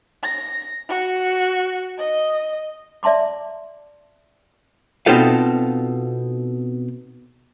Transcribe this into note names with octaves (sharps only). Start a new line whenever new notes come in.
A#6
F#4
D#5
D5 E5 A5 C6 D6
B2 C4 D#4 F4 A4 F5